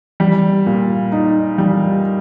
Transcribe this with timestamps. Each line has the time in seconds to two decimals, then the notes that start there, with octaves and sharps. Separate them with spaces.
0.20 G3
0.66 A#2
1.12 D#4
1.58 G3